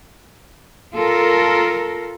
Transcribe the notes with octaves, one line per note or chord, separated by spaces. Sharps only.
F4 A4 A#4